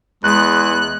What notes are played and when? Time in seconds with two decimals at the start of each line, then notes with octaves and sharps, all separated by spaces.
0.24 E2 G#3 F#6